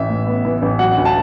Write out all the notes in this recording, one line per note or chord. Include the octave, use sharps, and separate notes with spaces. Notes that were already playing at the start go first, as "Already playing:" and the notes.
Already playing: A1 E3 E5
A2
B3
E3
A1
F#3 F#5
D2
A5